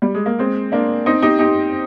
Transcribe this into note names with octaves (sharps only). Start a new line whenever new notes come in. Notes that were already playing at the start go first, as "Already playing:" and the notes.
G3
G#3
A#3
G#3 C4
A#3 D4
C4 D#4
D#4 G4
D#4 G4